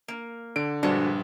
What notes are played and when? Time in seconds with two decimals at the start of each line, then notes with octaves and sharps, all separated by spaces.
0.08 A#3
0.56 D3 D7
0.83 A#1 G2 G#3 D4 F#4 C5